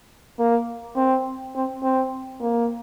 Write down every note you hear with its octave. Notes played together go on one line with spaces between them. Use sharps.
A#3
C4
C4
C4
A#3